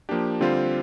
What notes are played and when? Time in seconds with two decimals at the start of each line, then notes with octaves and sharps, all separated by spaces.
0.09 F3 A#3 D4 G4
0.41 D3 G3 C4 F4 C5